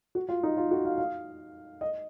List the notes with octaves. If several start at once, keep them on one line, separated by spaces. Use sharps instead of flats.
F#4
F4
D#4
F4
F#4
F5
F5
D#5